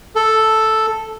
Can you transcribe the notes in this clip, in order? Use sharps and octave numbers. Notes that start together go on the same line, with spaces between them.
A4